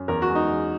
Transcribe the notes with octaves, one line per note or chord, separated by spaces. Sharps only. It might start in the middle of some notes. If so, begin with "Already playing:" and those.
Already playing: F#2
E2 A#4
F#4
G#3
D#4
E2